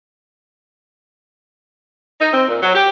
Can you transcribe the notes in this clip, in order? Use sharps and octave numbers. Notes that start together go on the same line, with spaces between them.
D#4
C4
A#2
F#3
G4